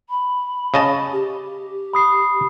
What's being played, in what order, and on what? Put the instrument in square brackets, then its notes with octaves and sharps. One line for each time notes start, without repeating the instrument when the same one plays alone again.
[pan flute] B5
[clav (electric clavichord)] C#3 D#5 A5
[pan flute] G4
[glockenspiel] B5 D#6 C7